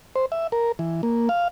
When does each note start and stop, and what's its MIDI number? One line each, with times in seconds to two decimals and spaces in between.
0.16 0.26 72
0.32 0.47 76
0.52 0.72 70
0.79 1.02 52
1.03 1.29 58
1.29 1.48 77